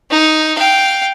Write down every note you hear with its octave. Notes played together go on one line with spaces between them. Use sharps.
D#4
F5 G5